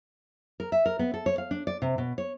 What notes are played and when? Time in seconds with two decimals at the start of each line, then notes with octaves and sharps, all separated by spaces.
0.60 A#4
0.72 E5
0.86 A#4
0.99 B3
1.14 A4
1.26 C#5
1.38 F5
1.51 D4
1.67 D5
1.82 C3
1.98 B2
2.18 C#5